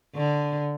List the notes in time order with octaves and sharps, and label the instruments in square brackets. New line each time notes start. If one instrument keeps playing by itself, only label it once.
[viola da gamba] D3